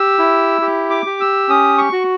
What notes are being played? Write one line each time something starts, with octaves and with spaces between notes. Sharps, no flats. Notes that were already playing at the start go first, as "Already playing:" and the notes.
Already playing: G4 E6
E4
G4
D6
G4
E6
C#4 D#6
C#6
F#4